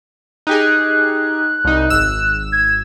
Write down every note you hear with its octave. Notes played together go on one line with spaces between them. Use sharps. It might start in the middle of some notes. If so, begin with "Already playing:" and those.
D#4 G4 G#4 F#6
C2 D#4
G#1 E6
G#6